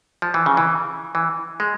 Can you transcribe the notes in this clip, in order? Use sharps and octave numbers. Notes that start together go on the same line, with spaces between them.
F3
E3
C#3
E3
E3
G#3